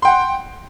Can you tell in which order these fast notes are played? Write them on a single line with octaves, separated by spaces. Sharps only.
C6 G5 F#5